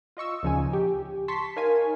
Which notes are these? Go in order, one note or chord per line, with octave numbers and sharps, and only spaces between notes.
F4 D#5 C#6 E6
D2 A#2 C#3 F3 D#4 G#5
G4
A5 C6 C#6 B6
D#4 A#4 C#5 F5 G#5